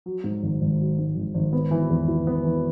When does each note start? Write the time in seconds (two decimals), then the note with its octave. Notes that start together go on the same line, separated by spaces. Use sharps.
0.06 F#3
0.24 G#2
0.43 G#1
0.61 G#1
0.79 F#3
0.98 G#2
1.16 G#1
1.34 G#1
1.53 B3
1.71 E3
1.90 E2
2.08 E4
2.27 B3
2.44 E3